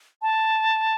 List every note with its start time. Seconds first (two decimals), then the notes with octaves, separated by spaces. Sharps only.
0.22 A5